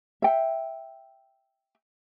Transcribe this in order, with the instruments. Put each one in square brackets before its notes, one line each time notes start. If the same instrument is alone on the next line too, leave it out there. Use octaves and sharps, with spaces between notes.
[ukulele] E5 G5